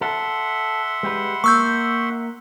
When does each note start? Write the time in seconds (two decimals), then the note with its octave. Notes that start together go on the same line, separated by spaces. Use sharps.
0.01 A4 E5 F#5 C6
1.03 G#3 G4 B4
1.44 A#3 C#6 E6 G6